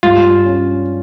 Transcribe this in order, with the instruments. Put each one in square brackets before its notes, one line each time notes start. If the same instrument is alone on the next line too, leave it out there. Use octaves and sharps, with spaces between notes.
[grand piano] G2 [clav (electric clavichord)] F4
[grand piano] C#4